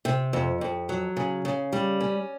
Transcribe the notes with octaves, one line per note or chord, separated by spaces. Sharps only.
C3
F2
F2
F#3
C#3
C#3
G3
C#4